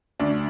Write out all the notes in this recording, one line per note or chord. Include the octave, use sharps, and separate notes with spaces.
D2 D4